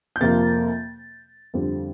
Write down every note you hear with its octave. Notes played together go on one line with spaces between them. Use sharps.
G6
F2 C3 F3 A#3 A6
F2 D3 G3 C4